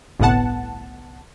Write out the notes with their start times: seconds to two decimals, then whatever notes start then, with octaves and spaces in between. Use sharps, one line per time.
0.19 G1 C2 A2 B3 F#5 A5